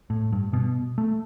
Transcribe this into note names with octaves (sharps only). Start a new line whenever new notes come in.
A2
G2
B2
A3